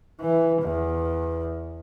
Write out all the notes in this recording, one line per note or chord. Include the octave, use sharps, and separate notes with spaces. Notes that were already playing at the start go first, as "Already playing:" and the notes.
E3
E2